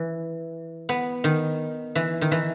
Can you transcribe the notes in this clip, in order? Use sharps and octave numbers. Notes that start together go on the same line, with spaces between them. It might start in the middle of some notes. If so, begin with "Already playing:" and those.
Already playing: E3
B3
D#3
E3
D#3
E3